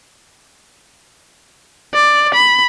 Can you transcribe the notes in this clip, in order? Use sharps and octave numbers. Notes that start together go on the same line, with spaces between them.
D5
B5